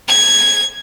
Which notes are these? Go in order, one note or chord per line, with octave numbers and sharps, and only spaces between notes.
G#6